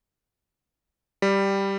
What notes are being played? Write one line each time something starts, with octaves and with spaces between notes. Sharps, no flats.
G3